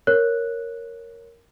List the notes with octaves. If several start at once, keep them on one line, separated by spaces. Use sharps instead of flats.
A#4 C#5 F#6